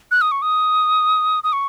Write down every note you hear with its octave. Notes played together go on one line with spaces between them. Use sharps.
F#6
D#6
C#6
D#6
D#6
C#6